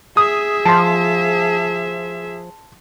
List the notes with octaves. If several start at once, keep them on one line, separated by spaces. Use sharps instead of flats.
G#4 E5 D#6
F3 A5 C6